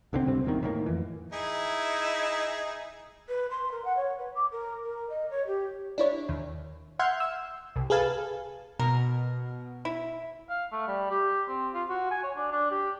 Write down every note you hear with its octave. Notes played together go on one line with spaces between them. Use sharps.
C2 D3 F#3 C4
C#2 G2 C3 C4
D#1 A#1 E2 D#3
A2 D#3 E3 A#3
F2 E3
D#4 E4 G#4
B4
C6
A#4
F#5
C#5
B4
D6
A#4
A#4
D#5
C#5
G4
D4 E4 C#5
D#2
E5 F#5 C6 F6 G6 G#6
E6
C2
G#4 A4 B4 F5 G#5 A5
B2 A#4
E4
F5
A3
G3
G4
C4
F4
F#4
G#5
C#5
D4
D4
G4